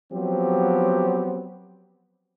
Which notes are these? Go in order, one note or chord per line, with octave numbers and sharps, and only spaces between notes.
F3 F#3 B3 C4 G4